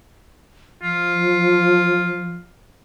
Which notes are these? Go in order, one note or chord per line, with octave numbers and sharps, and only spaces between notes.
F3 F4